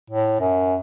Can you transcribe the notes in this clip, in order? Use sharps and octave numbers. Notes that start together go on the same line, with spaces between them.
A2
F#2